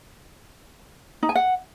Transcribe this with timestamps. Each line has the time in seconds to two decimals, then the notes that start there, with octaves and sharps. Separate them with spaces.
1.23 D#4
1.29 G#5
1.35 F#5